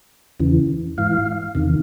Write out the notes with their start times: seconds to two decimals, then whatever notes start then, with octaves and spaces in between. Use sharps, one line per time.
0.40 E2 C#3 E3
0.98 G#2 E3 F5
1.55 E2 C3 D#3